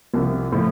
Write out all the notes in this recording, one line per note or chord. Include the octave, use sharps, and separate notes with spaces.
C2 C3 F3
A2 F3